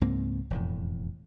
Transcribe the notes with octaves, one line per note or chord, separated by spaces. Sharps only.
C#2 G#2 A#3 C4
E1 F2 A2